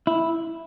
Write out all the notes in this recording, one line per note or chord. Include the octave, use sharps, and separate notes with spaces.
E4